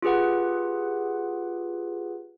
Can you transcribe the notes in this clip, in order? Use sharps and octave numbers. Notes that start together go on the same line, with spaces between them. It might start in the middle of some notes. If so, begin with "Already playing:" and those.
F4 G4 G#4 B4 F#5